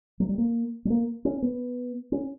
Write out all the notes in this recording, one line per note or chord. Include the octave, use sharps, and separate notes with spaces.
F#3
G3
A#3
G3
A#3
C#4
B3
C#4